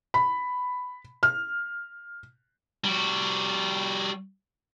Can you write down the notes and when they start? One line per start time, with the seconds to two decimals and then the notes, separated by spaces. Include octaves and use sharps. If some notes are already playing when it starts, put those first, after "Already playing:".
0.14 B5
1.23 F6
2.84 G3 F#4